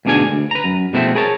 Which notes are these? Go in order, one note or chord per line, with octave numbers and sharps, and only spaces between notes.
D2 G#2 B2 D4 G#4 G#5
D2
B4 A#5
F#2
B2 F3 G#3 A3 C4 E4
G#4 A#4 C#5 A5